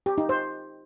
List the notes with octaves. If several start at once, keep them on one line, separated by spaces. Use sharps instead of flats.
G4
D#4
C5